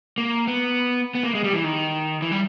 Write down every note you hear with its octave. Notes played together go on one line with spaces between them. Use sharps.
A#3
B3
B3
A#3
G#3
G3
E3
D#3
E3
G3